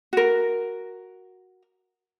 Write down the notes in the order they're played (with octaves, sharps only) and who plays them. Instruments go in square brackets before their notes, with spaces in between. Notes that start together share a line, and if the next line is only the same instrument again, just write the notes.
[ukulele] F#4 A#4